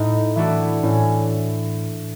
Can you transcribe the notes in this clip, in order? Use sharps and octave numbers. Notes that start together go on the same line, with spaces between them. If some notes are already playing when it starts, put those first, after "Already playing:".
Already playing: A2 D#4
E3 A3 D4 E4 F#4
A2 C#4